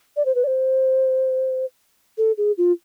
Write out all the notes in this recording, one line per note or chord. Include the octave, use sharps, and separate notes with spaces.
D5
C5
B4
D5
C5
A4
G#4
F4